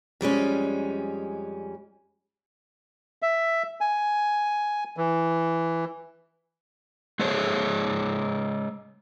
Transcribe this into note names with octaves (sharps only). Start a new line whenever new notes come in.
F2 G3 G#3 C#4
E5
G#5
E3
G#3 G#4 C5 C#5